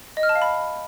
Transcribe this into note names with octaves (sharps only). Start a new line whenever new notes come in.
D#5
F6
A5
F5
B5